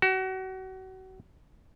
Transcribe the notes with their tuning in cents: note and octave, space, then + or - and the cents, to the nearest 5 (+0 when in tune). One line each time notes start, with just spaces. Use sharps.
F#4 +30